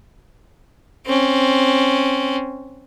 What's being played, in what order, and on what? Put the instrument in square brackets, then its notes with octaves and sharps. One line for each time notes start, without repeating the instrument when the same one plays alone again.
[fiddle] C4 C#4